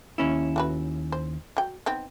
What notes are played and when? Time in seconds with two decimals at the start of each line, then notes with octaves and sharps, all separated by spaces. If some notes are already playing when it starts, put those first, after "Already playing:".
0.18 D#2 C#4 E4
0.56 A3 F#4 B4
1.12 C5
1.57 F#3 G5
1.86 B3 C4 D#4